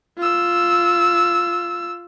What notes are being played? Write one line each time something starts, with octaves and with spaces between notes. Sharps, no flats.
F4 E6